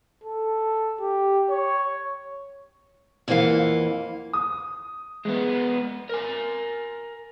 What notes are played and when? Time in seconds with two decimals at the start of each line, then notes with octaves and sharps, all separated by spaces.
0.24 A4
1.00 G4
1.50 C#5
3.28 F2 E3 A#3 F#4 F5 F#5
4.33 D#6
5.25 G#3 B3
6.09 A#4 G#5